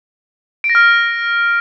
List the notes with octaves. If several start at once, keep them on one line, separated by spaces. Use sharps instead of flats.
D7
A#6
F6